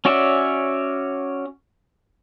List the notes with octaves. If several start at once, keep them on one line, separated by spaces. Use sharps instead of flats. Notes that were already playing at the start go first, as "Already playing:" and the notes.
C#4 F#4 C#5 D5 E5